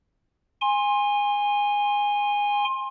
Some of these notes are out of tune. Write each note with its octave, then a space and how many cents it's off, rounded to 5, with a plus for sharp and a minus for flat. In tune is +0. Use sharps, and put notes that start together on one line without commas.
G#5 -15 C6 +20